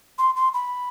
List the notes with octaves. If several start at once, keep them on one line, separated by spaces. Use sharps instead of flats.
C6
C6
B5